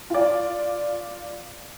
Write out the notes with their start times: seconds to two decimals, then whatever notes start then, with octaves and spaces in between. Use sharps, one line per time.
0.10 F4 D5